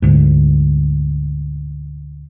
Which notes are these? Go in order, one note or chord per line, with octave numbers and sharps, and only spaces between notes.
D2 G#2